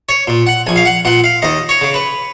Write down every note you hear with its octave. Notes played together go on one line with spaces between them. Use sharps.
C#5
A#2
F#5
A#1 G#5
F5
F#5
A#2 F#5
F5
D#2 D#5
C#5
C#3
B4